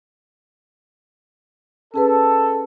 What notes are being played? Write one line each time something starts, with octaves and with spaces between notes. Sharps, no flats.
C#4 G#4 A4 B4